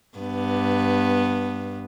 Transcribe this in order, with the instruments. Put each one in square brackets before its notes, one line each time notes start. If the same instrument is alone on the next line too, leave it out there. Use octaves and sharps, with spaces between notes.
[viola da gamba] G2 B3